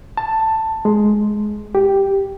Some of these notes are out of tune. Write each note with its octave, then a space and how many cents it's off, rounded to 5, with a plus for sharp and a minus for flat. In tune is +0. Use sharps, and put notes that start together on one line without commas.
A5 +10
G#3 +15
G4 +0